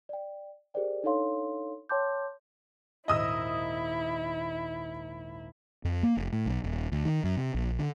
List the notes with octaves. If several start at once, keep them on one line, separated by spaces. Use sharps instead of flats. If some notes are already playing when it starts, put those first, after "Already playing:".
D5 G5
G4 G#4 A#4 C5 D5 G5
D4 D#4 A4 C#5 F5 C6
C#5 G5 A5 C6 D6 G6
G#1 D#2 A#2 E4 D#5 D#6 E6
F2
A#3
F1
A2
B1
D#1
D2
D#3
F#2
C3
A#1
D3